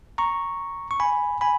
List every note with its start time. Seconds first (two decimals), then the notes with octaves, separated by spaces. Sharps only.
0.18 A#5 C#6
0.91 C#6
1.00 G#5 B5
1.41 G#5 B5